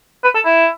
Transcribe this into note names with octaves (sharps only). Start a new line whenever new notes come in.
B4
A4
E4